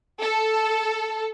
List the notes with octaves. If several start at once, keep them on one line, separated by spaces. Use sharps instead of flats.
A4